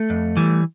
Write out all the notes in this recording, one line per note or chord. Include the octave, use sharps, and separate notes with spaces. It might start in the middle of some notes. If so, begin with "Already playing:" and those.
Already playing: A3
F2
E3 G3